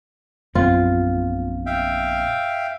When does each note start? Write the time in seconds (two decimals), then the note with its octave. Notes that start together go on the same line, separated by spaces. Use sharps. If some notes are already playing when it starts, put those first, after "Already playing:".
0.55 A#1 F#2 B3 C4 F4
1.66 E5 F5 G5